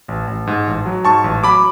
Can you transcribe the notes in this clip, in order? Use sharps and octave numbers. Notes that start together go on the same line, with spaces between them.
A1
A1
G#2
A1
F#3
G#2 A5 C#6
A1
F#3 B5 D6